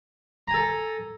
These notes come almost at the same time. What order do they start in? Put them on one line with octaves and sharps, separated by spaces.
A#5 G#5 A4